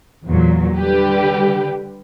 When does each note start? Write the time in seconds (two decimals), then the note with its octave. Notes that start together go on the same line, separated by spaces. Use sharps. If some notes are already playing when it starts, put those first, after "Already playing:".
0.25 E2 A#2 F#3
0.76 D3 G3 G4 B4